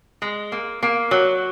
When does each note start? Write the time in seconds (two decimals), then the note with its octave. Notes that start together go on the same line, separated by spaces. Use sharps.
0.22 G#3
0.52 A#3
0.83 A#3
1.11 F#3